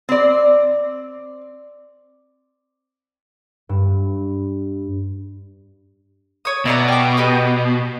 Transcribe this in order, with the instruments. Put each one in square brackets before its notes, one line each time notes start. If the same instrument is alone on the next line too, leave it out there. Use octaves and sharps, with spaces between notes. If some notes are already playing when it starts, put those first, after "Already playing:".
[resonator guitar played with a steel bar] C4 D5
[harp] G2
[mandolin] C#5 D#6
[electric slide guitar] B2 [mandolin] E4 D5 A#5
[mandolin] G4 D6
G4 B4 D#5